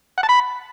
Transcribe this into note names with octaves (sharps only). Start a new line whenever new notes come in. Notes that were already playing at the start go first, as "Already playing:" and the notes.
F#5
A5
B5